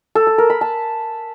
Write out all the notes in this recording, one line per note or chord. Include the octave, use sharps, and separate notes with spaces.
A4
A4
A#4
B5
A5